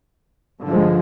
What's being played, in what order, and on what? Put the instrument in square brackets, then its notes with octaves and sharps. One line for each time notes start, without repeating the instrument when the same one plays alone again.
[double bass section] G2 D3 F3 G#3